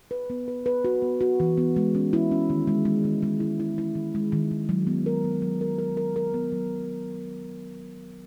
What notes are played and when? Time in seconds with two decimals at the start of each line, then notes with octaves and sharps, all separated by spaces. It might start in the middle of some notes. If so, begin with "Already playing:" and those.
0.11 B4
0.30 B3
0.48 B4
0.66 B4
0.84 F#4
1.02 B3
1.21 F#4
1.40 E3
1.57 B3
1.76 G#3
1.95 C#4
2.13 E4
2.31 C#4
2.50 D#3
2.67 G#3
2.85 G#3
3.04 D#3
3.22 G#3
3.40 E4
3.60 E4
3.78 E4
3.95 D#3
4.15 G#3
4.32 D#3
4.51 D#3
4.69 F#3
4.87 B3
5.06 A#4
5.24 B3
5.42 F#3
5.61 A#4
5.79 A#4
5.97 A#4
6.16 A#4
6.34 B3
6.52 F#3